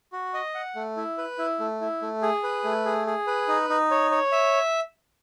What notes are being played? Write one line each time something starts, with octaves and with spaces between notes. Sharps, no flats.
F#4
D#5
F#5
A3
E4
B4
E4
A3
E4
A3
G#4
B4
A3
G#4
G#4
B4
D#4
D#4
C#5
C#5
E5